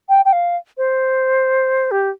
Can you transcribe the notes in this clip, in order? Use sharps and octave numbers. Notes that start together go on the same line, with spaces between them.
G5
G5
F5
C5
G4